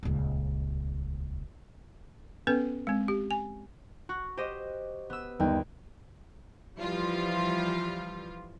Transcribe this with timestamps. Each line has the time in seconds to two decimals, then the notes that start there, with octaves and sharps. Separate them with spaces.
0.03 D#1 C#2
2.47 B3 C#4 A4 B4
2.87 G#3 C4
3.08 G4
3.31 G#5
4.09 F#4
4.37 G4 C5 D#5
5.10 B3 E6
5.40 G1 D#2 D#4 G5
6.79 E3 F3 G3 F4